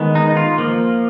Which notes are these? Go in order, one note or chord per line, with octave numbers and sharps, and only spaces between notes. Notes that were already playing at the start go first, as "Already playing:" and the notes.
Already playing: D#3 G#3 B3
D#4
F4
F3 A#3